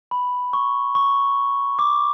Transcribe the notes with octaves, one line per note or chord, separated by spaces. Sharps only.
B5
C#6
C#6
D6